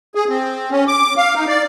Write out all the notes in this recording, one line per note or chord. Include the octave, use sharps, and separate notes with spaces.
G#4
C4
C#4
D6
F5
D#4
D5